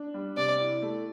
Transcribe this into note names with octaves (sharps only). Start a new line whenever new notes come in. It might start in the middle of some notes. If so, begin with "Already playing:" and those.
Already playing: D4
G3
C3 D5
E4
A3